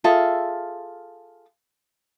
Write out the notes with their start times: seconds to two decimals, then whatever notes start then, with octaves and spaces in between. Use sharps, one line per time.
0.04 F4 G#4 A4 E5